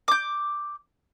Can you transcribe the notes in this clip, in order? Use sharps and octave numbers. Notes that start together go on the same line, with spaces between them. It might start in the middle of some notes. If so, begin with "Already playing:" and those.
D6 G6